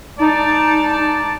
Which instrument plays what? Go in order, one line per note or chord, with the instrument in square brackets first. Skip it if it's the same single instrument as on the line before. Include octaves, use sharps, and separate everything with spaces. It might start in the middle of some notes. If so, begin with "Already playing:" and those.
[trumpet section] G#3 D5 A5 [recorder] D#4